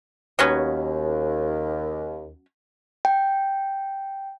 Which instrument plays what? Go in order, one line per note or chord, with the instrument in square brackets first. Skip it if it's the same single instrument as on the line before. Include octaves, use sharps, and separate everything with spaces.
[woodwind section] D#2 [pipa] F#3 B3 C#4
[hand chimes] G5